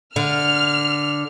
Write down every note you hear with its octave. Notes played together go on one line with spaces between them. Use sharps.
D3 F6